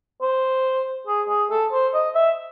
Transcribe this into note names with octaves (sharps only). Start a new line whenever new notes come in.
C5
G#4
G#4
A4
C5
D#5
E5